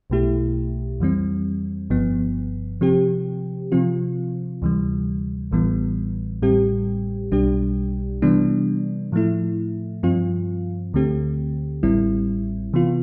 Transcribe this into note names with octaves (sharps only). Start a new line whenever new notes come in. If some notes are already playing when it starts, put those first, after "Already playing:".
B1 B2 A3 E4 G4
F2 E3 G3 C4
G1 G2 F3 B3
C3 F3 C4 G4
C3 F3 C4 F4
D2 C3 E3 G3
A1 A2 E3 G3 B3
A1 A2 G3 C4 G4
B1 B2 G3 D4 G4
C3 E3 G3 B3 D4
A2 F3 A3 E4
G2 F3 C4 F4
D2 D3 A3 C4 G4
A1 A2 G3 C4 E4
C3 E3 B3 F4